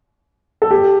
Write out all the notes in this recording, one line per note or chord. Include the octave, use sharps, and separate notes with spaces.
A4
G4